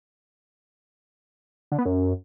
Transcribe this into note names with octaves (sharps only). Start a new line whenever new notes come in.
D3
B3
F#2